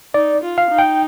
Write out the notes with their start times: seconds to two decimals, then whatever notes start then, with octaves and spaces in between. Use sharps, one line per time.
0.14 D#4 D5
0.43 F4
0.58 F5
0.71 D#4
0.79 G5